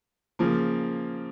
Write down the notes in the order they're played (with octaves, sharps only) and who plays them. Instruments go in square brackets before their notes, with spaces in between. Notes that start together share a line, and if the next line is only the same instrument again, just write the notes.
[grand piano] C#3 F3 A#3